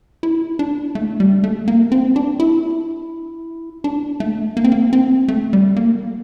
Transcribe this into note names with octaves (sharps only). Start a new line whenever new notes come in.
E4
D4
A3
G3
A3
A#3
C4
D4
E4
D4
A3
A#3
C4
A#3
C4
A3
G3
A#3